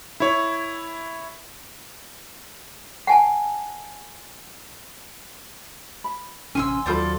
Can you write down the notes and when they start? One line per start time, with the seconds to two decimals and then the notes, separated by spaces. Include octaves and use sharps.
0.20 E4 C#5
3.07 F#5 G#5 A5
6.04 B5
6.55 A1 C3 C#4 G#5 C6 E6
6.86 D#2 F#3 E4 F4 A4 C5 D5 B5